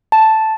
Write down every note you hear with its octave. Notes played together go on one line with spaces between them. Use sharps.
A5